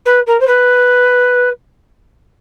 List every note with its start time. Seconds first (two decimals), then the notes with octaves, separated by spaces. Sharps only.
0.05 B4
0.26 A#4
0.40 C5
0.47 B4